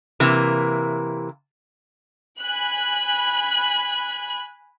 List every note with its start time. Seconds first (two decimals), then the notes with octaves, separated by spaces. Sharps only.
0.20 C3 E3 A#3
2.41 G#5 B5 F#6